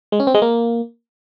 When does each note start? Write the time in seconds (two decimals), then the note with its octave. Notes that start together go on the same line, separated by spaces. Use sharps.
0.12 G#3
0.20 C#4
0.27 C4
0.34 G#3
0.42 A#3